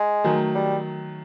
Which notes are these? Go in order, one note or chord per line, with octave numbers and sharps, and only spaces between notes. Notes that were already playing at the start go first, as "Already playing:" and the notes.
Already playing: G#3
D#3 F#3 A3
G3